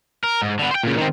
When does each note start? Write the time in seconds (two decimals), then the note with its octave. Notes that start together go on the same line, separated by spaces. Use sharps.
0.24 A#4
0.41 G#2
0.59 D3 B3
0.71 C5 G5
0.83 A#2 C#3
0.98 D#3 C4